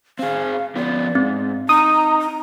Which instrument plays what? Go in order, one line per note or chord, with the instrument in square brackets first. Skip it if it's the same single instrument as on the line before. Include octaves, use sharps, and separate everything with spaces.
[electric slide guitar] C4 G#4 [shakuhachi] F5
[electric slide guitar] F3 B3 F4 [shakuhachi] D5
[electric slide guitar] G#2 [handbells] C4
[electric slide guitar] D#4 [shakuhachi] A#5 [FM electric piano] D#6
[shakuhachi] A#5